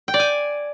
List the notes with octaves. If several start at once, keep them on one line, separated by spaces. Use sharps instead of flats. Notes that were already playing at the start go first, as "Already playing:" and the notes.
G5
D5
G#5